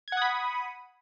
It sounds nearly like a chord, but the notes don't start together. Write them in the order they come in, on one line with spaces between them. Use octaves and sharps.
G#6 F#5 D#6 B5